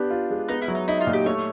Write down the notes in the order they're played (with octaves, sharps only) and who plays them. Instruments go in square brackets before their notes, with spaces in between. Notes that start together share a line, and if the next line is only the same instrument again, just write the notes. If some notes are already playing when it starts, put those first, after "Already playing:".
Already playing: [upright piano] B3 D4 [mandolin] G4
[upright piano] F4
G#3
[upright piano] B3 [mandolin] D#4
[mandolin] E4
[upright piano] F#3
[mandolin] D#4
[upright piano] D#4 [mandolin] E4
[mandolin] F4
[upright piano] A#2
[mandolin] G4
[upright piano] A3 [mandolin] C#5